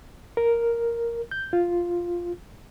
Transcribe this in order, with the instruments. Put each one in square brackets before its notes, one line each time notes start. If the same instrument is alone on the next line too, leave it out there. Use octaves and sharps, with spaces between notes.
[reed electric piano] A#4
G6
F4